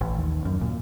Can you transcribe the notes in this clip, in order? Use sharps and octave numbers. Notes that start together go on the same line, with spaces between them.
A1
D#2
F#2
A#2